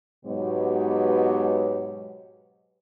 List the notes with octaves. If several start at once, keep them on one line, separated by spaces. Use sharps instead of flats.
G#2 B2 F#3 B3 G4 C#5